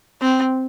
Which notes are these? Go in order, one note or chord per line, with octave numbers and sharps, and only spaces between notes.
C4